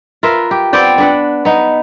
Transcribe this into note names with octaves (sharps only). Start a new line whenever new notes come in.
F4 A#4 B4 E5
G4
B3 C4 D5 G5
D4 B4 F#5
B3 D#4